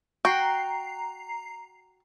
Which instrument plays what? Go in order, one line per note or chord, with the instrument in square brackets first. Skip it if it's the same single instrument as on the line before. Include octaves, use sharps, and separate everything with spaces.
[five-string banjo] F#4 [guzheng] G5 [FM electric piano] A#5 C7